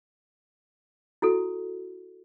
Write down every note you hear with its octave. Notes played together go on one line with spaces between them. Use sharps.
E4 F#4 A4